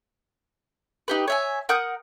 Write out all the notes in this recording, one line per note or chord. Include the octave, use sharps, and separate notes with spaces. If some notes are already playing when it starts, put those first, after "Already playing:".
D#4 G4 B4
C#5 E5 G#5
A#4 F#5 D#6 G6